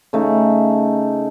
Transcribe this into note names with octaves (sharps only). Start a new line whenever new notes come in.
C#3 A3 D#4